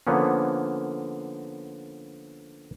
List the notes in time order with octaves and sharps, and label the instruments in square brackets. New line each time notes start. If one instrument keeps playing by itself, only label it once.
[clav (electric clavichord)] D3 F3 A#3 B3 C#4